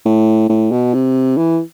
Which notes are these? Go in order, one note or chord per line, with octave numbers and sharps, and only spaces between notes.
A2
A2
B2
C3
E3